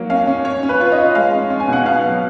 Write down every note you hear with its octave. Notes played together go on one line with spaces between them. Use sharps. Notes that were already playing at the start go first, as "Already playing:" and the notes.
Already playing: F#3 A#3
C#4 F5
C#4
C#4 C#5
C#4
B4
F4 C#5
D#5
F4
G#3 F5
C#4
C#4
G#5
B2 F#5
B3 F5
F#3